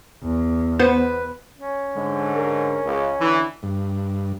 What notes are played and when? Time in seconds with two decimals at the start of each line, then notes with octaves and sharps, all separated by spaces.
0.23 E2
0.79 B3 B4 C5
1.59 C#4
1.96 G#2 D3 G#3
2.34 A#4
2.85 C#2
3.20 D3 E3 E4
3.63 G2